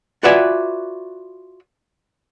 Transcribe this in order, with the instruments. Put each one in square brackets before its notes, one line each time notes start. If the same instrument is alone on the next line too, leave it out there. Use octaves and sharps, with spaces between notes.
[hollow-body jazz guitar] F4 F#4 B4 D5 E5 G#5